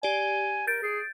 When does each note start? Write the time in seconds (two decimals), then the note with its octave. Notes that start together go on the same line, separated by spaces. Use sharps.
0.03 G4 D5 G#5
0.67 A#4 G6 A6 D7
0.83 G#4